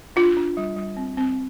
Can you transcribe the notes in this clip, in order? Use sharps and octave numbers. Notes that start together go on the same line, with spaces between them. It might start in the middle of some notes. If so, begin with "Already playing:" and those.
D4 F4
D4
G3
G3
C4
C4